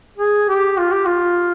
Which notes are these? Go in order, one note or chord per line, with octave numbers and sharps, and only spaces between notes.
G#4
G4
F4
G4
F4